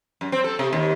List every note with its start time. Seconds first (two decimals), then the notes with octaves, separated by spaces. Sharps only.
0.21 F#2
0.32 C4
0.44 A4
0.59 C3
0.73 D#2